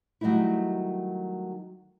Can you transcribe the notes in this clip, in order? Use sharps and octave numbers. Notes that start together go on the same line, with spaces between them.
D#3 F#3 G3 A3 D#4 E4